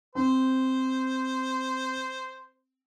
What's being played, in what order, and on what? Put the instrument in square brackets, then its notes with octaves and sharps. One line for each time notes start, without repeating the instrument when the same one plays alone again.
[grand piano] C4 [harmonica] C5